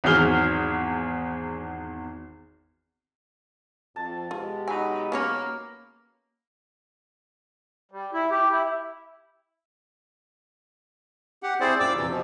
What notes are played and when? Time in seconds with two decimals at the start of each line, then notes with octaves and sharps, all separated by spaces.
0.04 G#1 E2 F#3 G#4 F6 G7
3.96 F2 A5
4.31 B2 G#3 F4 G4
4.68 F#3 D#4 G#5 B5
5.12 A#3 B3 C#4 C#5
7.92 G3
8.14 E4
8.30 G4
8.51 E4
11.43 G4 F#5
11.60 C4 E4 G#4 C5 D5
11.80 F#2 A#2 D5 D6 E6
11.96 F2 C3 E3
12.09 B2 F3